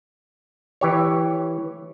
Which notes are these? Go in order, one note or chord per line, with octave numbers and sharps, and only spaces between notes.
E3 G4 C#5